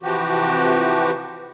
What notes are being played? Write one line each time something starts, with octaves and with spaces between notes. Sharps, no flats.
C3 E3 F3 F#4 G4